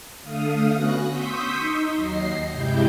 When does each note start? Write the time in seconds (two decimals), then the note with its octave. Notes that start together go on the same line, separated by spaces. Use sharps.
0.23 D3 A3 F5 D#6
0.74 B3 C#4 F#4 F#6 A#6
1.07 C6 C#6 D#6 E6 G6 B6
1.58 D#4
1.95 D#2 F#3 D#5 C7
2.50 G2 C3 G#3 E4 G4 G6